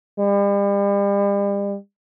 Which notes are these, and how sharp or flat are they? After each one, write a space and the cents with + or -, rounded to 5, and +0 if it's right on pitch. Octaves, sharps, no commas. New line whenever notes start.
G3 +40